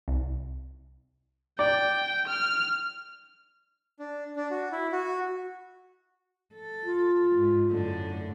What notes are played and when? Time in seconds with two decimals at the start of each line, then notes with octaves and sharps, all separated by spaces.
0.08 C2
1.59 D5 G5
2.27 F6
4.00 D4
4.36 D4
4.51 F#4
4.72 E4
4.92 F#4
6.54 A4
6.85 F4
7.35 G#2
7.69 F#2 A2 D3